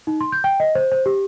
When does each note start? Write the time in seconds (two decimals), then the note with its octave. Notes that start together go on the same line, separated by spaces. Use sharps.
0.07 D#4
0.21 C6
0.32 G6
0.44 G5
0.60 D#5
0.75 C5
0.92 C5
1.06 G4